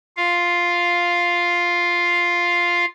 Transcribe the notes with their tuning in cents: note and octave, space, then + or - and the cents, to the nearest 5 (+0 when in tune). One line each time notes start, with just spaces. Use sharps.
F4 +0 F5 +0